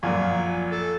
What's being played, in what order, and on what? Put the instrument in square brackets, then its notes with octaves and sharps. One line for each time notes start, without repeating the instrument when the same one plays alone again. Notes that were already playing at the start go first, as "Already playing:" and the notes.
[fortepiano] A#1 F#2 A#2 [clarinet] G#5
[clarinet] A4